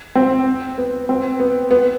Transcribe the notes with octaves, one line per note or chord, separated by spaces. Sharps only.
C4
B3
C4
B3
B3